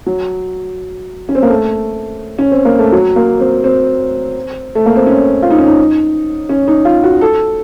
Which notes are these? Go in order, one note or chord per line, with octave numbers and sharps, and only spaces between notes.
F#3
C#4
C4
A#3
A3
C#4
C4
A#3
A3
F#3
A#3
C4
C4
A3
A#3
C4
C#4
F4
D#4
C#4
D#4
C#4
D#4
F4
F#4
A4